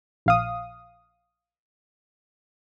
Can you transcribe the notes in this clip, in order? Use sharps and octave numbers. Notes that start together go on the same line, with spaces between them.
A#1 F5 D#6